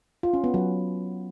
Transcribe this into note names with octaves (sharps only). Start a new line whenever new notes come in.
F4
C#4
B3
F#3